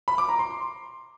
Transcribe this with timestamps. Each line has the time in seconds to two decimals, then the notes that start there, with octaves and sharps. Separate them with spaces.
0.08 B5
0.18 D6
0.29 A#5
0.39 C6